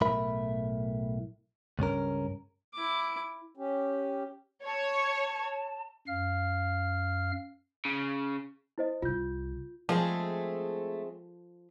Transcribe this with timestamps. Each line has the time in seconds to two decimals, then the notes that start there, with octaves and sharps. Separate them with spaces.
0.01 B1 A2 A#4 E5 B5
1.79 C#2 G2 C#4 A#4
2.74 E4 D6
3.57 C#4 G4
4.66 C#5 A5
6.07 F#2 F5 F6
7.85 C#3
8.78 E4 C5 D#5
9.02 C2 C3 F4 G6
9.89 F3 G#3 A3 C4 G#4